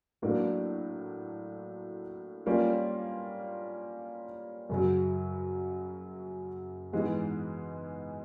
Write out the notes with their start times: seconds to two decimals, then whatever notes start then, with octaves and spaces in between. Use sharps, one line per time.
0.22 A2 F#3 A#3 D4
2.46 G3 A#3 C#4 F4
4.69 F#2 C#3 F#3
6.93 G#2 E3 G#3 B3